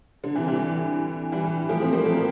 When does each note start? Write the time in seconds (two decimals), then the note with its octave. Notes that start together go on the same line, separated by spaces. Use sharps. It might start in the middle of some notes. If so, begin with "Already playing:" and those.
0.24 D3
0.36 C3 E3
0.47 E3 G3
1.32 E3 G3
1.69 F3 A3
1.81 A3 C4
1.93 G3 A#3
2.06 F3 A3